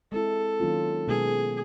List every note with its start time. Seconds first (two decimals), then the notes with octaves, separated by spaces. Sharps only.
0.12 G#3 C4 E4 A4
0.60 D#3 F#3 A#3 C#4 F4
1.08 B2 G#3 B3 D#4 G#4